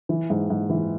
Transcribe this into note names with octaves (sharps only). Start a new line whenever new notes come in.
E3
G#2
G#2
E3